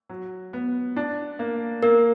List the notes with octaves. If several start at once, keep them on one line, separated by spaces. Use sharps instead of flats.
F#3
B3
D4
A#3
A#3 A#4